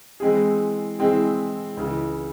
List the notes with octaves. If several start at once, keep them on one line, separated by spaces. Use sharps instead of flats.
E3 G#3 C4 E4 G#4
E3 G#3 C4 E4 G#4
C#2 C#3 E3